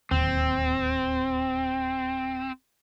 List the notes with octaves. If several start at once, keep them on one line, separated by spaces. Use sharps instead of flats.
D1 D#2 C4